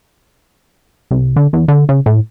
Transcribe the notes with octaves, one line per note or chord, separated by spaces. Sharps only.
C2
D3
E2
D3
C#3
A2